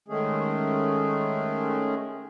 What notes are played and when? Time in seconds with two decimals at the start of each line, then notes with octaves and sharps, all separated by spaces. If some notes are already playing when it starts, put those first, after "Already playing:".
0.08 D#3 G#3 A3 C#4 G#4